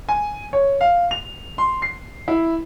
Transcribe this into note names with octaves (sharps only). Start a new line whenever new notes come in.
G#5
C#5
F5
F7
C6
C7
E4